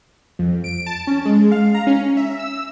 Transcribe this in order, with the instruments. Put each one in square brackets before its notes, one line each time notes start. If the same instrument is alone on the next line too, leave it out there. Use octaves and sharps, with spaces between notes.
[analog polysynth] F2
D7
A5
C#4
G#3
F5
A#5
C#4
E5
E6